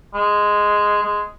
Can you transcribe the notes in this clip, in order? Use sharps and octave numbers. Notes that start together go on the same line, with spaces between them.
G#3
G#3